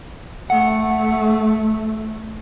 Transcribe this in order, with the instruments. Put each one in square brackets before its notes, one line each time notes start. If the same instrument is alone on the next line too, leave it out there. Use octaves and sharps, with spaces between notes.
[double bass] A3 [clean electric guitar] F#5